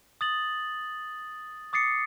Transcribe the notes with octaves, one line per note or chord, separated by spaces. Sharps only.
D#6 A6 F#7
D6 D#6 A6 C7 C#7